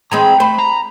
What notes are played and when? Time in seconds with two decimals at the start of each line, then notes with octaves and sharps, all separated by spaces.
0.12 E3 G#3 C4 A#5 B5
0.40 A3 C5 B5
0.58 A#5